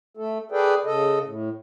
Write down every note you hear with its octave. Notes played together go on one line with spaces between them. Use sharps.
A3 A4
G#4 A4 B4 D5 G5
C#3 A4 D#5
A2